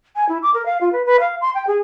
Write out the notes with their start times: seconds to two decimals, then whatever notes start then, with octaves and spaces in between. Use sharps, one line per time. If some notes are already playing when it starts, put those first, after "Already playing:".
0.16 G#5
0.29 E4
0.42 D6
0.54 A#4
0.66 F5
0.81 F4
0.92 B4
1.05 B4
1.20 F5
1.41 C6
1.54 G5
1.67 G#4